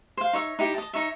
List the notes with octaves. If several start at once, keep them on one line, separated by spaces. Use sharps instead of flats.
C5 F5
D#4 C#5 E5 C#6
D#4 E4 G4
D#5 A5
D#4 C#5 E5